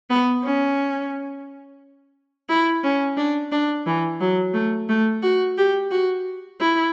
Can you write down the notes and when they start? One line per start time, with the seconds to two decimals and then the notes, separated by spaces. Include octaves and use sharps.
0.10 B3
0.44 C#4
2.50 E4
2.84 C#4
3.17 D4
3.52 D4
3.86 E3
4.21 F#3
4.54 A3
4.89 A3
5.23 F#4
5.57 G4
5.91 F#4
6.61 E4